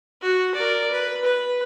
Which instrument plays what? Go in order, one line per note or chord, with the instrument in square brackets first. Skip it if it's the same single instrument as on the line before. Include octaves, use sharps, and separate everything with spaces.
[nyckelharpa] F#4
A#4 D5
B4
B4